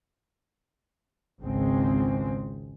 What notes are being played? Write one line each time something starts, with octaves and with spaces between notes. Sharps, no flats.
G#1 C#2 G#3 C4